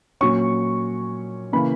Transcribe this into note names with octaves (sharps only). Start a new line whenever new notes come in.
A#2 F#3 C#4 C#6
C#3 E3 A#3 B5